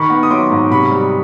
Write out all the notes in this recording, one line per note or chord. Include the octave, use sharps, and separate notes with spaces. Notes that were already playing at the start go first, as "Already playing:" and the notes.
Already playing: D#3 B5 C#6
B3
D#6
F#3 C6 D6
G#2
C3 B5 C#6
G3